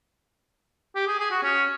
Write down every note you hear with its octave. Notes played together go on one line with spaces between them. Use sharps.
G4
G#4
G#4
F#4
C#4